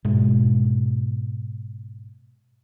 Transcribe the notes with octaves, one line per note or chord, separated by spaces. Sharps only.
G#2 B2 G#3